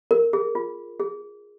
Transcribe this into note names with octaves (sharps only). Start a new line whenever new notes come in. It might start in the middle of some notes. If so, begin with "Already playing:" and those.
A#4
G#4
F4
G#4